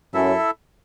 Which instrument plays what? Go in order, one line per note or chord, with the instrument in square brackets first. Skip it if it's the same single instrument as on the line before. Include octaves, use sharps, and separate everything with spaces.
[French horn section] F#2 [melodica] E4 A4 E5